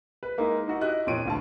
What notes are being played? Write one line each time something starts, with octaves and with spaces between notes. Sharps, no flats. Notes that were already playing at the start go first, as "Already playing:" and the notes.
B4
G#3 A#3 D#4 E4
D#4 E4 F#4
E4 G4 D#5 F#6
F2 A#2 C#5 D7 D#7
G1 D2 A5